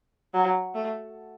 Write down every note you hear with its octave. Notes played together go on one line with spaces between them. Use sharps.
F#3
A3